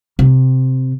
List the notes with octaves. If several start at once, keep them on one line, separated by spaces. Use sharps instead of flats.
C3